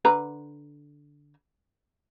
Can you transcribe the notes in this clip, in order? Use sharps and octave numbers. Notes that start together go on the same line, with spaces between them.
D3 B4 A#5